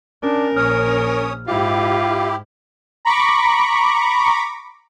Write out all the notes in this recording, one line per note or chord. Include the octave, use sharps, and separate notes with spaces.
C#4 D4 A#4
A#1 C#4 C#5 D#6 F6
G#2 E4 F4 G4
A#5 B5 C#6 D6